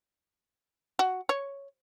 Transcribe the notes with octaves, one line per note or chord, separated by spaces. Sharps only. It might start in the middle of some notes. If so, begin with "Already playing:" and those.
F#4
C#5